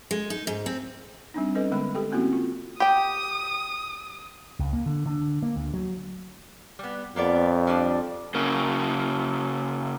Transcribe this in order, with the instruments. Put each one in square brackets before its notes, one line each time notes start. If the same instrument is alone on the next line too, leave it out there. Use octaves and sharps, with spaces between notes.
[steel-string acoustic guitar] G#3
D#4
G#2
C4
[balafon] G3 C4 D4 D#4
C#4 A4 B4 D#5
D3 G#3 B3 B5
G4 A4 G5
A#3 C4 C#4 E4 F#4
F4
[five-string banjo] G4 G5 [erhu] D#6
[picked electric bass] C#2
A#3
D3
D3
A#3
D2
F#3
[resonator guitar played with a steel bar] G3 B3
[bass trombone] F2 [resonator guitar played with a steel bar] A#3 B3 D5
[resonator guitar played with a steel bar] F3 G3 D4
[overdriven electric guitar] C#3 A#3